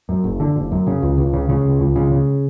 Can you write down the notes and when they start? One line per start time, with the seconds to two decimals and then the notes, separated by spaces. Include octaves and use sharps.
0.09 F#2
0.24 F#1
0.40 D3
0.56 F#1
0.71 F#2
0.87 C#3
1.02 C#2
1.18 C#2
1.33 C#3
1.49 C#3
1.65 C#2
1.80 C#2
1.96 C#3
2.12 C#3